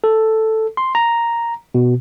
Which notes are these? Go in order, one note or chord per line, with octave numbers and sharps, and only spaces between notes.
A4
C6
A#5
B2